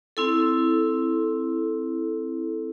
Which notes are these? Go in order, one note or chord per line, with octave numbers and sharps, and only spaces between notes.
C4 E4 A4